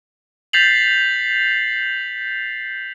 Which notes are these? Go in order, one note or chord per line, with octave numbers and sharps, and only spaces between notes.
G6 A6 B6 C7 F7 F#7